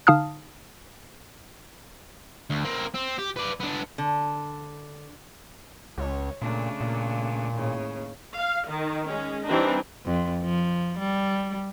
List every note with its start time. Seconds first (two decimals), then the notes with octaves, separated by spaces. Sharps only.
0.07 D3 D#4 F5 A5 D#6 F6
2.50 D2
2.64 A#3 C4
2.94 C4
3.18 G4
3.36 B4 D5
3.60 B3 D4
3.98 D3
5.98 C#2 C#5
6.42 A#2 C#3 A3 D4
6.81 A#2
7.54 D#2 A2 C#3
8.35 F5
8.69 D#3
9.08 G#3 C#4
9.47 E3 G3 C4 D4 D#4
10.05 F2
10.42 F3
10.99 G3